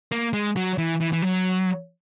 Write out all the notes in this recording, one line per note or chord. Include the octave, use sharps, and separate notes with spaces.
A#3
G#3
F#3
E3
E3
E3
F#3